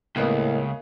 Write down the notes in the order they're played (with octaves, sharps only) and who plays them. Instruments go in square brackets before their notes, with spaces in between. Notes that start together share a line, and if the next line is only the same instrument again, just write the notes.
[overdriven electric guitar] C#2 [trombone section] A2 [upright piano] C#3 B3 [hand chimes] A#3 A#4 D#5